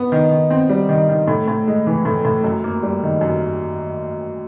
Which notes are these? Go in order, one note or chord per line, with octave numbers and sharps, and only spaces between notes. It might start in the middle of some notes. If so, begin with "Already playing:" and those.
Already playing: B3
D#3
D#3
C4
G3
D#3
D#3
A2
A2
G#3
E3
A2
A2
F#2
A#3
G3
D#3
F#2